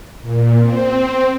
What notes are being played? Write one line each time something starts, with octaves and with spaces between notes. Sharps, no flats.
A#2
C4